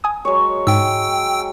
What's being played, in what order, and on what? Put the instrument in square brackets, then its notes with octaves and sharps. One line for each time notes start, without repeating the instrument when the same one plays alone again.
[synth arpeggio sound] G#5 D#6
[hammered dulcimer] F#3 G#3 C#5
[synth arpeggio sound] G#2 [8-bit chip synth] G5 E6